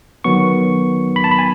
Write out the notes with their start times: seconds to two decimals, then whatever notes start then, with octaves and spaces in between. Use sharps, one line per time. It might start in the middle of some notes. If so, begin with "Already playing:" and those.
0.24 D#3 F#3 B3 C#6
1.16 B5
1.24 A5
1.31 B5
1.39 G#5